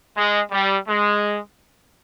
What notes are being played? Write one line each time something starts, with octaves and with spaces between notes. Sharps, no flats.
G#3
G3
G#3